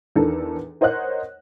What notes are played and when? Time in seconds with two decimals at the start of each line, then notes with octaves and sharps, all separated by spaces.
0.16 E2 D#3 D4 A4 A#4
0.81 A#4 C5 C#5 D#5 F#5 F#6